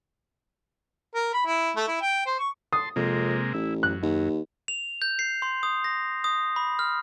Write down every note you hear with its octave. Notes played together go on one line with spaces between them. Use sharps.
A#4
B5
E4
A3
E4
G5
C5
C#6
A5 C6 D#6
F2 C3 G#3 A#3
A1 E4
F#2 F#6
D#2
F7
G6
C7
C6
D#6
A#6
D#6
B5
F6